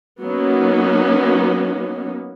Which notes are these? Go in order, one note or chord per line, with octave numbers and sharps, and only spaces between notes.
F#3 A#3 B3 C#4 D#4